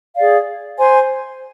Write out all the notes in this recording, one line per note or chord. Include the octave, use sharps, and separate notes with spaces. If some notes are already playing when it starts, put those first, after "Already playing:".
G#4 D5 F5
C5 G#5 C6